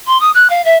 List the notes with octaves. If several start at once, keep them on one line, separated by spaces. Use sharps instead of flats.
C6
D#6
F#6
F5
E5